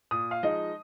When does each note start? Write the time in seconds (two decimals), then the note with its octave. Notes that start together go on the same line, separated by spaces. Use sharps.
0.11 A#2 D#6
0.31 F5
0.43 F3 G#3 D#4 D#5